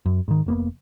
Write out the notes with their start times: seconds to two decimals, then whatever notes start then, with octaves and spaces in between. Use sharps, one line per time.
0.06 F#2
0.28 G#2 D#3
0.46 F1 A#3 B3